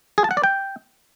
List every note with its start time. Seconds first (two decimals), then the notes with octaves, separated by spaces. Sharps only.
0.18 G#4
0.24 A5
0.31 F#5
0.37 D5
0.44 G5